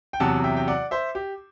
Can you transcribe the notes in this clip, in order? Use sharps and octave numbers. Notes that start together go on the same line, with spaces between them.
G5
E2 C3 F#3 F#5 A5
E5 G5
G5
D5 F#5
C5 E5
G4